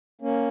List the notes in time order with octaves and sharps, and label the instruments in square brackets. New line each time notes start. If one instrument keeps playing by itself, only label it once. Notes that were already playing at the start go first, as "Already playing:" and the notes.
[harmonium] A#3 C#4